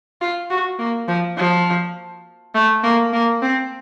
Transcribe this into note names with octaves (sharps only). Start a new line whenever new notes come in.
F4
F#4
A#3
F3
F3
A3
A#3
A#3
C4